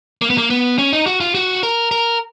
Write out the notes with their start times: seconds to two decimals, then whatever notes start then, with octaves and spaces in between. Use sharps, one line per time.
0.22 A#3
0.30 B3
0.38 A#3
0.50 B3
0.78 C#4
0.93 D#4
1.07 F#4
1.21 F4
1.35 F#4
1.63 A#4
1.91 A#4